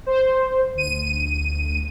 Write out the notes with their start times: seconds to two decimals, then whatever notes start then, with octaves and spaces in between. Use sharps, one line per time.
0.06 C5
0.74 D2 D#7